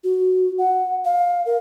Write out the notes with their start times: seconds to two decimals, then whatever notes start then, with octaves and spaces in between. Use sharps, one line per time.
0.04 F#4
0.58 F#5
1.05 F5
1.46 A#4